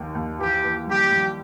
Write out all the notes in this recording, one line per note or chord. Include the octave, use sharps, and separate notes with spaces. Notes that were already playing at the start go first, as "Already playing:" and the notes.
Already playing: D#2 D#3
D#2
E3 G4
E3
G3 G4
G3